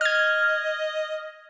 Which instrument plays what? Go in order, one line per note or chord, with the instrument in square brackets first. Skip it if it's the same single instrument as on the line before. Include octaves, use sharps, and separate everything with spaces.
[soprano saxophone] D#5 [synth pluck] F6 G#6